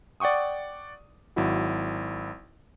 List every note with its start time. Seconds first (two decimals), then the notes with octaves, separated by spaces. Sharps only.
0.20 D5 F#5 G5 C#6 D#6
1.36 G#1 F#3 E4 F#4